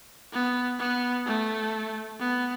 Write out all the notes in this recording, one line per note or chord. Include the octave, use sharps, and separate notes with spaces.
B3
B3
A3
B3